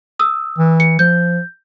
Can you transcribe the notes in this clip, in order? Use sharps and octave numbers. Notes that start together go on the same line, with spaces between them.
D#6 E6
E3
C#7
F3 G6